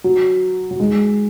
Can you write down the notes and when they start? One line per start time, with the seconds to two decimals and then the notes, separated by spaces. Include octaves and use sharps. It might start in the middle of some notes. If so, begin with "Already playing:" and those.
0.04 F#3
0.71 F#3
0.80 G#3